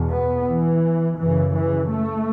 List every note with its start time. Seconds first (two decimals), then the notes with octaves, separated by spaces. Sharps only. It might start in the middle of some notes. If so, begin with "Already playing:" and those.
Already playing: E2 B2
0.11 B3
0.47 E3
1.20 F#2 C#3 E3
1.56 E3
1.92 A3